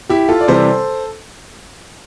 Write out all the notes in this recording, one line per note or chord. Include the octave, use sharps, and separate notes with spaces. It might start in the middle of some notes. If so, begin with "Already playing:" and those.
E4 G4
F4 A4
D5
C3 E3 G3 A4 C5